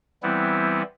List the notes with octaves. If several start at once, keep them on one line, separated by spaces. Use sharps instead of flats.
E3 G3 B3 C4 E4